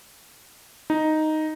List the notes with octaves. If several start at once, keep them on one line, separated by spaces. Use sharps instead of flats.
D#4